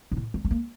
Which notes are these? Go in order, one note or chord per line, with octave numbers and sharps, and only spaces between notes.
G2
A2
G3
A3
A#3